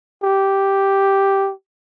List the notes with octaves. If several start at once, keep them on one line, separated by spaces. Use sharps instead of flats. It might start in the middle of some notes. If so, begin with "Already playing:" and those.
G4